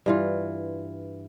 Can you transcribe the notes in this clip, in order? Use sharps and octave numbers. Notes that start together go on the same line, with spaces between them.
G2 E3 F4